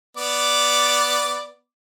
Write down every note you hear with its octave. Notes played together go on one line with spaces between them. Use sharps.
B3 D5 D6